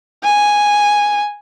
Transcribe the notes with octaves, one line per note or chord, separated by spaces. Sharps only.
G#5